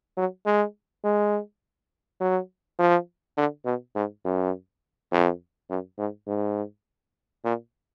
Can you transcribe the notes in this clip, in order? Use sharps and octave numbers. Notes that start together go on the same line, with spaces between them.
F#3
G#3
G#3
F#3
F3
D3
B2
G#2
F#2
F2
F#2
G#2
G#2
A#2